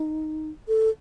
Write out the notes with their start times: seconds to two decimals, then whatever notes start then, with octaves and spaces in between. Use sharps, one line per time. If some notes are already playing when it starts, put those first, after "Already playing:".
Already playing: D#4
0.68 A4